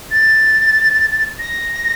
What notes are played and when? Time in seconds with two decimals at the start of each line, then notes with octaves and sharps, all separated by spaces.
0.11 A6
1.39 A#6